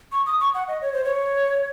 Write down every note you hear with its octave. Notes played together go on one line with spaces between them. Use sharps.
C#6
D#6
C#6
F#5
D#5
C#5
C5
C#5